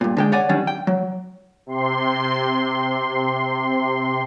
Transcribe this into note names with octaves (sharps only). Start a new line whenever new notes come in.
G2 A#2
D3 G#3 G5
C#5 D5 F#5 G#5
D#3 F#3 G3 C#4 D4
G5
F#3
C3 C6